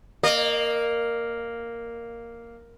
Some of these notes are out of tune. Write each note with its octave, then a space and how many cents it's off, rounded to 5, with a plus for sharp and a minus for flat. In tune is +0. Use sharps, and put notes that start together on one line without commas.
A#3 +0 D#5 -35